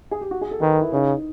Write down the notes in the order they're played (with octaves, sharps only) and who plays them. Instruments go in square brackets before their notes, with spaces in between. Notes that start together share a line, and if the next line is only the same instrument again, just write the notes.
[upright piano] G#4
G4
F#4
G#4
A4
[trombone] D#3 [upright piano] B4
[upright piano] A#4
E4
[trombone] C#3 [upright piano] D#4